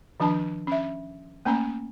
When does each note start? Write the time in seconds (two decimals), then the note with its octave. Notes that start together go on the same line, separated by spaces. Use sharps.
0.20 D#3 F3 D4 A5
0.67 C#4 E5
1.45 A3 A#3 C#4 A#5